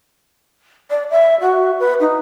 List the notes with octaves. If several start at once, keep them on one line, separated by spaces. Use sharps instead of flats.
D5
E5
F#4
B4
D#4